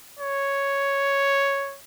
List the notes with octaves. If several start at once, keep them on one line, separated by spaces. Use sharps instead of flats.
C#5